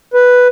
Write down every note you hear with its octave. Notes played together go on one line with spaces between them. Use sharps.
B4